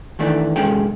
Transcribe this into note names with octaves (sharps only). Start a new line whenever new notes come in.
D#3 E3 A3 D4
C2 F#2 G#3 C#4 A4 G5